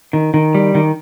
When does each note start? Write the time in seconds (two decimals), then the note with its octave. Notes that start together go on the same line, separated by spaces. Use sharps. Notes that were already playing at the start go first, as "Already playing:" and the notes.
0.13 D#3
0.34 D#3
0.55 G3
0.75 D#3